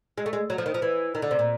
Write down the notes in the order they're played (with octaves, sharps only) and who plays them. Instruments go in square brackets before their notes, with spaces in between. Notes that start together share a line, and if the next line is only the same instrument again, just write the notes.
[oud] G#3
A3
G#3
F#3
F3
D#3
F3
E3
D#3
D3
C3
A#2